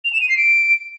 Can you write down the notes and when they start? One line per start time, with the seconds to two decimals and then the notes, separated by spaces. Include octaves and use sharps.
0.05 F7
0.13 E7
0.21 D#7
0.29 C7
0.37 D7